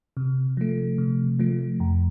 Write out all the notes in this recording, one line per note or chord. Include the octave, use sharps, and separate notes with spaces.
C3
F3 A3
C3
F3 A3
F2